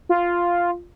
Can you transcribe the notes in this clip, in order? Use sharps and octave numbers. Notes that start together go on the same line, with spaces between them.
F4